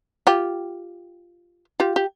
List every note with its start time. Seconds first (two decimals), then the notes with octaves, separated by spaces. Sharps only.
0.27 F4 G4
1.80 F4 G4
1.96 G4